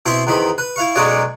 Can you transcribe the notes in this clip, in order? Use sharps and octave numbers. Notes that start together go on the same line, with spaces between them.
B2 C4 E4 E5 C6
E2 D#3 C4 B5
B4
E4 F5 C#6
B1 F#2 G#3 F#4 C#5 D5